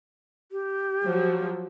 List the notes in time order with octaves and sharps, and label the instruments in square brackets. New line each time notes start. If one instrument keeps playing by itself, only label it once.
[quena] G4
[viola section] F3 F#3